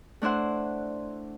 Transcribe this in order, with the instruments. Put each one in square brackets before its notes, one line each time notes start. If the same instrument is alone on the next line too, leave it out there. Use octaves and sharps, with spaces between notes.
[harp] A3 D4 E4 C5 F#5